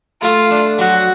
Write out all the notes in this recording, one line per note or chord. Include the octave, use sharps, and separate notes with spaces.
A3 F4
D4
F#3 F#4